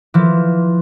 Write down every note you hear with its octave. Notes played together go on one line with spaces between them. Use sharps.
E3 F3